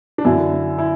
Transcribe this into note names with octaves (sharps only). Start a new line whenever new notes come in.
D4
F#2 D3 E4
E4